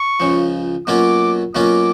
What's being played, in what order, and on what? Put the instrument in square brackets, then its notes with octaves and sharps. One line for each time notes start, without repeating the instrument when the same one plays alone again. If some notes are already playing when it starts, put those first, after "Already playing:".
Already playing: [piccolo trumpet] C#6
[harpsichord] C#2 C#3 F3
[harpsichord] B2 F#3 A#3 C#4 F4 [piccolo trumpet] D6
[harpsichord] B2 F#3 A#3 C#4 F4 [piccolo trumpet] D6